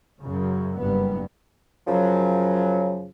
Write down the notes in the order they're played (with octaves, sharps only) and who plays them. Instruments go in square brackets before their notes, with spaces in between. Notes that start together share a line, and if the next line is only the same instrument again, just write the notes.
[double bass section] F#2 C#3
F#1 G2 B3
[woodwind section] F#2 C#3 F3 F#3